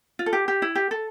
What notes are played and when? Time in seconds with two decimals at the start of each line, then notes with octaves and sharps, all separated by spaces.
0.19 F4
0.26 A4
0.33 G4
0.48 G4
0.62 E4
0.75 G4
0.91 A4